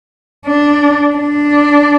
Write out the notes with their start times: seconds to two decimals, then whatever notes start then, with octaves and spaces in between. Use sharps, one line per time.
0.46 D4
1.16 D4